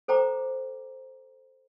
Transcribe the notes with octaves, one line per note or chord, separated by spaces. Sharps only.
A4 C5 G5 A#5 D6